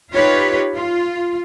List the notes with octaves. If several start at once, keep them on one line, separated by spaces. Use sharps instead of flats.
D#4 F4 G4 B4 C#5
F4